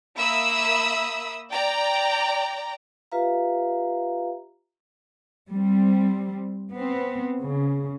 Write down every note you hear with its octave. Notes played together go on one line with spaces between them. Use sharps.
A#3 E5 B5 D#6 E6
D5 G5 A#5
F4 G4 B4 E5 F5 A#5
G3 C4
B3 C4
C#3